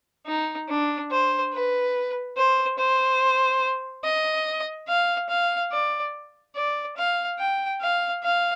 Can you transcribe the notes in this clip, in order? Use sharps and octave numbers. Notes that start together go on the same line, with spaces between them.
D#4
D4
C5
B4
C5
C5
D#5
F5
F5
D5
D5
F5
G5
F5
F5